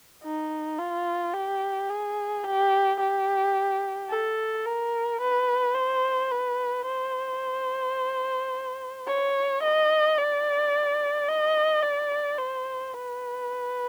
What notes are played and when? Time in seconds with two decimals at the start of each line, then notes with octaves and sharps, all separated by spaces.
0.23 D#4
0.78 F4
1.34 G4
1.89 G#4
2.44 G4
3.00 G4
4.10 A4
4.65 A#4
5.20 B4
5.75 C5
6.31 B4
6.86 C5
9.07 C#5
9.63 D#5
10.17 D5
11.28 D#5
11.82 D5
12.38 C5
12.93 B4